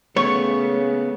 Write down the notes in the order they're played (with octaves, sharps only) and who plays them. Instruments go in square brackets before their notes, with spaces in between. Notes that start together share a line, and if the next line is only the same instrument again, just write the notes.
[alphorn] C#3 [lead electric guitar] A3 B3 [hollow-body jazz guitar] C#5 [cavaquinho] C#6